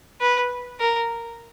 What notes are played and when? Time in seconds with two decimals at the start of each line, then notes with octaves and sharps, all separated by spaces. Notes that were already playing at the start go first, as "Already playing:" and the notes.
0.21 B4
0.80 A#4